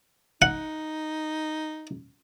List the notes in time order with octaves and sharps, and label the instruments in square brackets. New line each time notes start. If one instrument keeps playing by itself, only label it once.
[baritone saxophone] D#4 [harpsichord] F#5